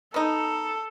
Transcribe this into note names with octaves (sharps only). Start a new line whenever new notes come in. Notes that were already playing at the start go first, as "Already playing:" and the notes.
B3 D#4 A4